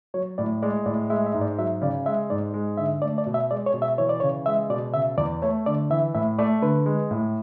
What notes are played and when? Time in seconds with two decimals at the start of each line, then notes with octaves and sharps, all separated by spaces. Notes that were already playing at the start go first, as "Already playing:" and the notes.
0.14 F#3 C#5
0.38 A2 D5
0.62 G#3 D5
0.86 A2 D5
1.10 G#3 E5
1.26 E5
1.34 G#2
1.41 D5
1.58 F#3 E5
1.81 C#3 D5
2.06 G#3 E5
2.30 G#2 D5
2.54 G#3
2.78 D3 E5
3.02 A3 D5
3.18 D5
3.26 B2
3.34 E5
3.51 G#3 D5
3.66 C#5
3.74 B2
3.82 E5
3.98 E3 C#5
4.09 D5
4.20 C#3 C#5
4.46 G#3 E5
4.70 B2 D5
4.94 C#3 E5
5.18 E2 D5
5.42 A3 C#5
5.66 D3 D5
5.90 E3 E5
6.14 A2 E5
6.39 A3 D5
6.62 D3 B4
6.86 G#3
7.11 A2